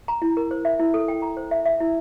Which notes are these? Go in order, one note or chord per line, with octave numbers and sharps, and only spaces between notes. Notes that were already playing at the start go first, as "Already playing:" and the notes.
A#5
E4
A#4
C5
E5
E4
A4
G5
A#5
C5
E5
E5
E4